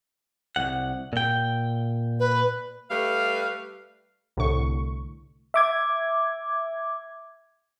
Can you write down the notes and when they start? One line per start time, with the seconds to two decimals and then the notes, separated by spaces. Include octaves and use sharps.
0.56 C2 F#5
1.13 A#2 G5
2.20 B4
2.90 G3 A3 B4 F5
4.37 C2 A2 D3 C#6
5.54 E5 D6 G#6